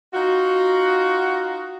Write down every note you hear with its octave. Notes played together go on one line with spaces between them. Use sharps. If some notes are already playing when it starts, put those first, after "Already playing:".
D#4 F4 F#4